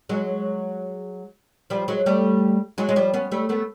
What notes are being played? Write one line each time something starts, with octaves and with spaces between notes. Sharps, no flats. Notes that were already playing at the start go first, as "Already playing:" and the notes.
F#3 G#3
F3 G3
F#3 G#3
G3 A3
F#3 G#3
G#3
F3 G3
B3 C#4
G3 A3
A3 B3